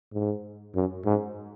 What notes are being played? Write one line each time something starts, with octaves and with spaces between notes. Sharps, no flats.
G#2
F#2
G#2